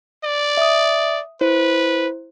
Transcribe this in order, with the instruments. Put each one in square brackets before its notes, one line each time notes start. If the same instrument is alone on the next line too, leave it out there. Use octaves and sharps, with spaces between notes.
[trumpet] D5
[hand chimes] E5 D#6
[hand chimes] E4 C5 [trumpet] B4